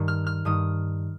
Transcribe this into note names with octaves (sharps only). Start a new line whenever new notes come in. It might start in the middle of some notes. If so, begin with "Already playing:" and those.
Already playing: G2 D#3
F6
F6
G2 D#3 D#6